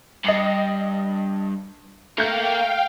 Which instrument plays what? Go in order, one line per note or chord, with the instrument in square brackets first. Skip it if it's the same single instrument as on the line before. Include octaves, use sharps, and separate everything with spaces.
[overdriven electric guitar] G2 [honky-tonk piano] D#5 C7 C#7
[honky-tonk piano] A3 G6 [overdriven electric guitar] A#3 A#4 [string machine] F5 G5